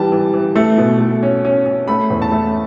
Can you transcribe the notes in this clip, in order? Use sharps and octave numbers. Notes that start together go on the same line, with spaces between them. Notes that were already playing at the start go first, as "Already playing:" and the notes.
Already playing: E3 G3 A5
E3
E3
A3
B2
A3
C#4
C#4
C#4
A3 B5
E2
A5
A3